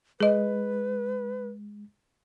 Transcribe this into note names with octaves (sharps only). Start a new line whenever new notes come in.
G#3 G#4 B4 D#5